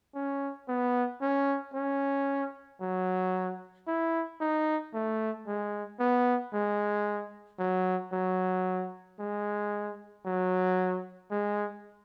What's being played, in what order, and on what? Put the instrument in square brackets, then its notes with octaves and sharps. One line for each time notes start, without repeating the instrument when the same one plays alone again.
[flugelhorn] C#4
B3
C#4
C#4
F#3
E4
D#4
A3
G#3
B3
G#3
F#3
F#3
G#3
F#3
G#3